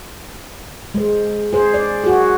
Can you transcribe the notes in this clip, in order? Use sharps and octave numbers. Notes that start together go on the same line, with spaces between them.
G#3 C5
G#4 C5
D5
F#4 G#4